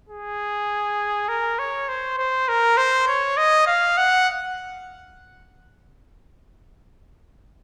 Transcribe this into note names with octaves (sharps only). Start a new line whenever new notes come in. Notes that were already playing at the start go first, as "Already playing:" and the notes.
G#4
A#4
C#5
C5
C5
A#4
C5
C#5
D#5
F5
F#5